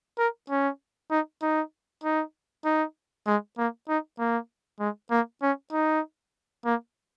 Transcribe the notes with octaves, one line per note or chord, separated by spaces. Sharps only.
A#4
C#4
D#4
D#4
D#4
D#4
G#3
A#3
D#4
A#3
G#3
A#3
C#4
D#4
A#3